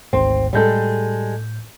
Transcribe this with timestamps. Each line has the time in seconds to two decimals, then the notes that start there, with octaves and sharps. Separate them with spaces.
0.13 G#1 D2 G#2 C4
0.53 A2 G3 G#3 A4 G6